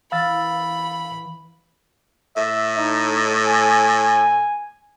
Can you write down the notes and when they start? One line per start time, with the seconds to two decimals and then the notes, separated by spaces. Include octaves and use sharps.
0.12 E3 F5 B5 E6 A6
2.37 A2 E5
2.78 D#4
3.47 G#5